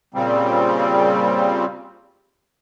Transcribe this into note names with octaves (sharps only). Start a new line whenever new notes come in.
A#2 C#3 G3 C4